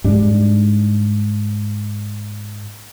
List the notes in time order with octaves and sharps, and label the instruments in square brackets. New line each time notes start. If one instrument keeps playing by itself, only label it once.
[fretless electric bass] G#2 G3 D4